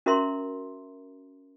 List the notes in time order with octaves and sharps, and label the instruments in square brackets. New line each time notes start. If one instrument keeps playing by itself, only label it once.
[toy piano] C#4 F#4 A#4 E5 A#5 C6